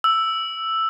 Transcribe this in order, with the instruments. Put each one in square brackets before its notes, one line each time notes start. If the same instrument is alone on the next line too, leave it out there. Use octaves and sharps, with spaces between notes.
[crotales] E6